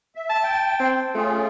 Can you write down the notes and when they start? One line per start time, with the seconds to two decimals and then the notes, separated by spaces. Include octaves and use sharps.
0.15 E5
0.30 A5
0.43 G5
0.80 C4
1.15 A3 C#4 F4 G#4